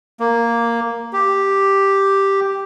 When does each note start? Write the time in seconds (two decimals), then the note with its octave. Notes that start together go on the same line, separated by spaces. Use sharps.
0.20 A#3
1.13 G4